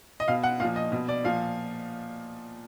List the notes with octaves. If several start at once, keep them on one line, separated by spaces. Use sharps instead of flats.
D#5
B2 F5
F#5
A#2 F3 F5
D#5
B2
D5
A#2 F3 F5